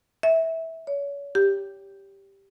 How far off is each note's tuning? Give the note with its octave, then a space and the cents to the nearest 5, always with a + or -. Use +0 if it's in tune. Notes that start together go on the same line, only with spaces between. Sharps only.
E5 -15
C#5 +35
G4 +0